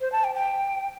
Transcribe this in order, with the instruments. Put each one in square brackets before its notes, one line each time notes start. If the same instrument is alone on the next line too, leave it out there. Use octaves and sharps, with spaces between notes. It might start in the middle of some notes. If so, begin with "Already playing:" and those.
[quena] C5
A5
G5
G5